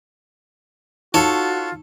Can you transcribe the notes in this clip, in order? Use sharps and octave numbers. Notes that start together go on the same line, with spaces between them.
D#4 F4 F#4 A4 C#5